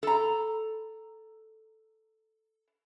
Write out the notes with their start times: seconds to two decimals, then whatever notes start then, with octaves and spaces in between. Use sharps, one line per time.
0.03 A4 A#5